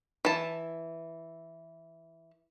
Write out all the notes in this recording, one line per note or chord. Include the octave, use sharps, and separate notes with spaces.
E3 A5